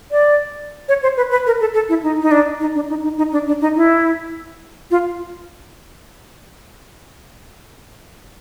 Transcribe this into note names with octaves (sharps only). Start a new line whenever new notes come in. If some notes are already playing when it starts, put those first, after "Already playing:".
D5
C#5
C5
B4
B4
A#4
A4
A4
E4
D#4
D#4
D4
D#4
D4
D#4
D#4
D#4
D4
D4
D#4
E4
F4